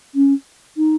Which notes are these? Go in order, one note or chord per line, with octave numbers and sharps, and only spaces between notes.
C#4
D#4